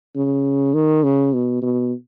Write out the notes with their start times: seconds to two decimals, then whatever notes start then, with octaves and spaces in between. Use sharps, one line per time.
0.16 C#3
0.74 D#3
1.03 C#3
1.33 B2
1.62 B2